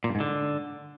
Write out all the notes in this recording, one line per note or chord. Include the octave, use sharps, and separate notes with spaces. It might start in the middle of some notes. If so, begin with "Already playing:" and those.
A#2
G2
G#2
D3